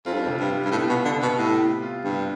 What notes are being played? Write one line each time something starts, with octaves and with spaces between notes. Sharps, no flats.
F2 F4
G2
F2
C3
G2
G3
G2
A2 B3
B2
F4
D3
C3
B2
A2 G3
B3
F4
G2 C3